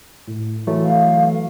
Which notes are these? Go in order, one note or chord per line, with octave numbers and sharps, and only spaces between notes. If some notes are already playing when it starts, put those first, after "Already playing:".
A2
E3 F#3 A3
F5